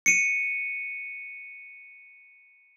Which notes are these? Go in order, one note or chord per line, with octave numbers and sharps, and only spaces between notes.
C#7 D#7